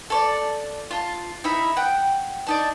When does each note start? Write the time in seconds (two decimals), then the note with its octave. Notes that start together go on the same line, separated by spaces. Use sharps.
0.10 A4 C#5 D5
0.91 F4 A5
1.44 D#4 E4 E5 B5
1.77 F#5 G5
2.47 D4 D#4 A5